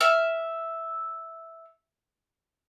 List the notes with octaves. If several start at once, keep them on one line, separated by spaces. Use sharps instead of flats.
E5 F6